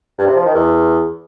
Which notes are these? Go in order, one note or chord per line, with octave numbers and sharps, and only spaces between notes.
G2
C3
F3
D#3
E2